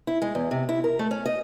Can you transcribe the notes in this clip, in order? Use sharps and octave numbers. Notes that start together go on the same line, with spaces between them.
E4
G#3
E2
C3
E4
A#4
A3
C#4
D#5